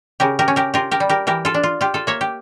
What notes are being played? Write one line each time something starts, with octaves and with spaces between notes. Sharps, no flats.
C#3 G4 A#4
G4 A#4
C#4
G4 A#4
F4 G4 A#4
G4 A#4
G3
G4 A#4
E3 G4 A#4
F4 A4
D4
F4
F4 G4
F4 A4
A#3 C#5 E5
G4